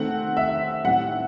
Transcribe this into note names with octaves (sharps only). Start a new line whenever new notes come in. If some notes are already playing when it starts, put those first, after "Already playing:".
Already playing: D#3 A3 C4 F#5
E5
A2 G3 C4 F#5